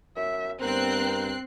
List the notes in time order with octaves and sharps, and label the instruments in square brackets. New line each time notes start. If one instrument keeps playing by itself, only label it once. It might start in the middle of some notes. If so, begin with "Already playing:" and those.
[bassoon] F#2 [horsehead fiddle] E5
[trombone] G2 [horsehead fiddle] B3 [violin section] C4 F#6 C7 [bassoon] A#4